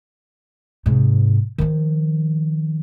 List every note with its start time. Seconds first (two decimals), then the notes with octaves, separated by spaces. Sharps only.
0.86 G#2 C3
1.58 D#3 F3